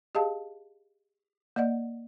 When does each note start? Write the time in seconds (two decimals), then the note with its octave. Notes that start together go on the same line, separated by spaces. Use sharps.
0.15 G4 G#4 D#5 F5 A5
1.56 A#3 D5 D#5 F#5